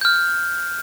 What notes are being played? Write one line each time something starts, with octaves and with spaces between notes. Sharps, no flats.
F6 G6